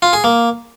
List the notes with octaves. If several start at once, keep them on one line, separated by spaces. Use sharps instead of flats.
F4
G#4
A#3